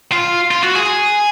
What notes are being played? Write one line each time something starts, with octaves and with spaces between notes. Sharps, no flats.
F4
F4
F#4
G#4